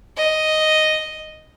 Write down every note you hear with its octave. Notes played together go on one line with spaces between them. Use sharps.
D#5